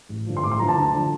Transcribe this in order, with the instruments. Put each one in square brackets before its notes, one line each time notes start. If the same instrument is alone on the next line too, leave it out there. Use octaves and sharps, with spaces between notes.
[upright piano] A1
G2 D3 F3
C6
A1 D6
C6
G2 D3 F3 A#5
A5
D2
D3 F3